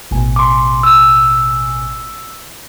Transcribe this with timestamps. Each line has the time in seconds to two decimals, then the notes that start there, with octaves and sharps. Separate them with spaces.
0.11 A1 B2 G#5
0.36 C6 D6
0.83 E6